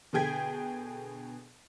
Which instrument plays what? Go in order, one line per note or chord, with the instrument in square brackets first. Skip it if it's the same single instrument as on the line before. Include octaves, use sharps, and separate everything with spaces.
[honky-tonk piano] B2 D3 G#4 G5 G#6 B6